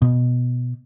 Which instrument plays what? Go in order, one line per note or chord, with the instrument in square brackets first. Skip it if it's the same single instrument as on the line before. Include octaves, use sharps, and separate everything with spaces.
[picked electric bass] B2